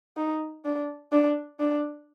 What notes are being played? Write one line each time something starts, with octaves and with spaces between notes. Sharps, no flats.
D#4
D4
D4
D4